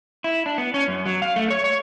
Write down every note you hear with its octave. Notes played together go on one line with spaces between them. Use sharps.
E4
D4
B3
C#4
F#2
F#3
F5
A3
C#5
C#5